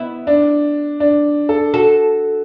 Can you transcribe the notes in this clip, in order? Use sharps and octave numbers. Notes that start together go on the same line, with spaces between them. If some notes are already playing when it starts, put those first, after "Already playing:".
Already playing: B3 E4
D4
D4
A4
F#4 A4